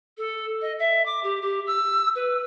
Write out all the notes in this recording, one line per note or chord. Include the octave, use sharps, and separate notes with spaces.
A4
D#5
E5
D6
G4
G4
E6
B4